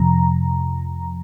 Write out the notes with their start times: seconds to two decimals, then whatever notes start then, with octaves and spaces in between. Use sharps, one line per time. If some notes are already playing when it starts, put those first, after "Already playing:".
Already playing: F2 C3 F3 A#5